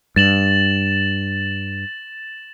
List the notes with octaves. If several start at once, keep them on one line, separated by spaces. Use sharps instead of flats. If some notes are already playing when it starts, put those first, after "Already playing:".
G2 A6 E7 F#7